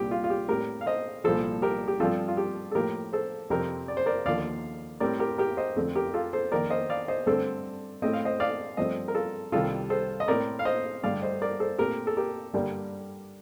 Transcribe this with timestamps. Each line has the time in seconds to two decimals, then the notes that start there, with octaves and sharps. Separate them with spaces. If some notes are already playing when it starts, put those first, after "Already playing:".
Already playing: C2 A#2 G3 C4 G4
0.11 F4
0.24 F4
0.30 G4
0.49 A2 G3 C4 G4 A#4
0.81 F5
0.86 C5 D#5
1.24 C2 A#2 F3 A4 C5
1.62 G4 A#4
1.88 G4
2.00 G2 F3 C4 F4 A4
2.28 F4
2.37 G4
2.71 A4
2.74 A2 F3 A#3 G4 A#4
3.13 A4 C5
3.50 F2 C3 G3 C4 G4 A#4
3.88 D5
3.97 C5
4.06 A#4 D5
4.26 D#2 D3 F3 A#3 D5 F5
5.00 A2 G3 C4 A#4 D5
5.20 G4 A#4
5.38 G4 A#4
5.57 C5 D#5
5.76 F2 D3 A3 C4
5.96 G4 A#4
6.14 F4 A4
6.33 A4 C5
6.52 F2 D#3 A#3 A#4 D5
6.70 C5 D#5
6.90 D5 F5
7.08 C5 D#5
7.27 G2 D3 A3 C4 A4 C5
8.02 A2 A3 C4 D#5
8.13 F5
8.25 C5 D#5
8.40 D5 F5
8.77 G2 F3 A3 C4 C5 D#5
9.08 A#4
9.15 F4 A4
9.52 C2 C3 D#3 G3 C4 F4 A4
9.90 A4 C5
10.20 D#5
10.28 A2 A3 C4 A#4 D5
10.59 F5
10.65 C5 D#5
11.03 G2 D3 A3 D5 F5
11.22 C5 D#5
11.42 A#4 D5
11.60 A4 C5
11.78 A#2 A3 C4 G4 A#4
12.07 A4
12.17 G4 A#4
12.54 G2 D3 G3 A#3